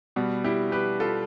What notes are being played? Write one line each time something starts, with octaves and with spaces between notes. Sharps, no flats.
B2 G3 B3
E4 G4
G4 B4
F4 A4